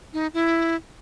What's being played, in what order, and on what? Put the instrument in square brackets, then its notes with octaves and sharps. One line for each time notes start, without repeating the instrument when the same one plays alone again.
[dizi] D#4
E4